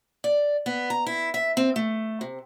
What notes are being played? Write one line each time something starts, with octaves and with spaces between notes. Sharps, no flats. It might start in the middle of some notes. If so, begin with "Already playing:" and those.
D5
B3
A#5
E4
E5
C4
A3
C3